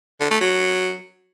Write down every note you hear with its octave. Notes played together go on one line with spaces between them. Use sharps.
D3
A3
F#3